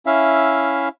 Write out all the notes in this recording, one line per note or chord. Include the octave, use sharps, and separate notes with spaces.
C#4 E4 E5 F5